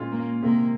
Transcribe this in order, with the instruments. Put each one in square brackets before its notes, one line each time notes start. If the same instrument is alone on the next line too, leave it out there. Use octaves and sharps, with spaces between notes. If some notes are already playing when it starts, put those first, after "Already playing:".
Already playing: [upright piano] A#2 G#3 C#4 F4
[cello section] A#3
[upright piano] C3 D#3 G#3 [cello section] A#3